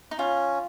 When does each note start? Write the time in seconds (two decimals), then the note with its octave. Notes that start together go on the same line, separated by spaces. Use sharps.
0.11 D#4
0.19 C#4 F4